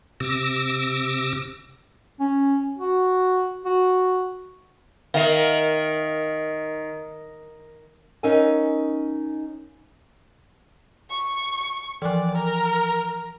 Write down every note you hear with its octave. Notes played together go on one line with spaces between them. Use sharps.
C3 D6 E6 A#6
C#4
F#4
F#4
D#3 A#4 E5 F5
C#4 D#4 A#4 E5 F5 G#5
C#6
E3 F3 D5
A#4